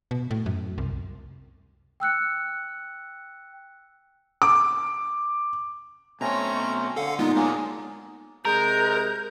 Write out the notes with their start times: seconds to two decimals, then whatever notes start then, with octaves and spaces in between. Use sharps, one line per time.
0.11 B2
0.31 A2
0.46 F#2
0.78 C2
2.00 G5 E6 F#6 C#7
4.42 D6
6.21 B2 A3 C4 C#4 C#5 A#5 A#6
6.96 D3 A4 F5 F#5
7.19 A#2 G#3 B3 D#4 F4
7.36 A#2 F#3 G#3 A#3 B3 G#4 A#4 G#5
8.45 C3 G#3 A#4 G6